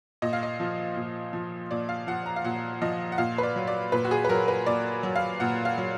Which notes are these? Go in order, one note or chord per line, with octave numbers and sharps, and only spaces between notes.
A#2 D#5
F5
D#5
F3
A#2
F3
A#2 D5
F5
F3 F#5
A#5
F5
A#2 F#5
F3 D#5
F#5
A#2 F5
B4
D5
F#3
D5
A#2 B4
F#4
G#4
B4
F#3 A#4
B4
A#2 D5
F#3
F5
A#2 F#5
F5
F#3